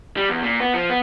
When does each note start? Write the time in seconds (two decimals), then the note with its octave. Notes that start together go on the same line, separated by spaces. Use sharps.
0.17 G3
0.29 E2
0.43 A#2
0.60 B3
0.74 F3
0.89 B3